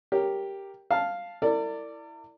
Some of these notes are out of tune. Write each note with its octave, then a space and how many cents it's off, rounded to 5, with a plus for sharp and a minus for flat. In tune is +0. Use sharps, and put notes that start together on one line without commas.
G4 +0 A#4 +0 C#5 +0
F5 +0 A5 +0
E4 +0 A#4 -45 D5 +0